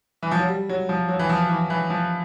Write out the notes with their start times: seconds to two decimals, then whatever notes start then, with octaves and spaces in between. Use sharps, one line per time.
0.22 E3
0.31 F3
0.40 F#3
0.48 G3
0.69 F#3
0.89 F3
1.09 F#3
1.19 E3
1.29 F3
1.49 E3
1.70 E3
1.90 F3